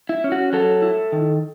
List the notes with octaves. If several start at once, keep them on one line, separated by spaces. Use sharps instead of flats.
E4
C#4
F#4
F#3 A4
E4
D#3